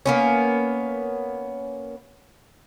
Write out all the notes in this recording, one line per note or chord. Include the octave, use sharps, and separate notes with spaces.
A#3 B3 C#4